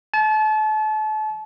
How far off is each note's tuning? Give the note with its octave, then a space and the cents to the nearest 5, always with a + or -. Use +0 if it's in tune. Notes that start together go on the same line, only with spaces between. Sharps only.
A5 -35